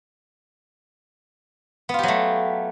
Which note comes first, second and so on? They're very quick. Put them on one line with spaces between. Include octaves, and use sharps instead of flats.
B3 F4 G4 F#3 A3